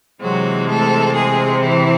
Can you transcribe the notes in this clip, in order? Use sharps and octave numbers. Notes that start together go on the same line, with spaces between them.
C3 E3 F#3 G#3 C4 F#4
A3 A4
G#3 G#4
E3 E4